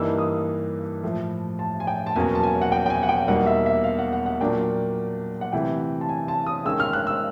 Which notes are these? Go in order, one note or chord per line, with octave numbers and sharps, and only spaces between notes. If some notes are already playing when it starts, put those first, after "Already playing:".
Already playing: G2 E3 G3 A#3 D#4 E6
D#6
A2 F3 A3
A5
G#5
G5
A5
E2 B2 F#3 A#3 C#4 G#5
A5
G#5
F#5
G5
G5
G#5
F#5
G5
E2 B2 G3 A#3 D#4 F#5
E5
E5
F5
F#5
F#5
F#5
A#2 F#3 A#3 D4 G5
F#5
C3 E3 A3 G5
A5
G#5
A5
D#6
D#3 G#3 C#4 E6
F6
F#6
E6